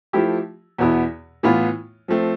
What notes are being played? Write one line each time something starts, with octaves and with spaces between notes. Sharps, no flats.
F3 A3 E4 G4
E2 B2 B3 E4
A2 E3 B3 F4
F3 A3 C4